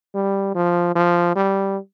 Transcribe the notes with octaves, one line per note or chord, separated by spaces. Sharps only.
G3
F3
F3
G3